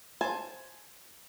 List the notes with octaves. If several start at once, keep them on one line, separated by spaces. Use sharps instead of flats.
C5 G#5 A5